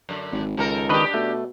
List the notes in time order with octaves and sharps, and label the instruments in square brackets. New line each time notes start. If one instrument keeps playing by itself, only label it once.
[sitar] F#2 D3
[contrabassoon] G#1
[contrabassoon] C#2 [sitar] D#3 A4 A#4
[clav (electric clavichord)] D#3 B4 D#5 [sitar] D4 G4
[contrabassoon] B2 [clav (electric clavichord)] A3